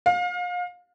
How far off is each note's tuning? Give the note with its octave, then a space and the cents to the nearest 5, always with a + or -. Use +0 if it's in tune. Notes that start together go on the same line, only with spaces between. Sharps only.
F5 +35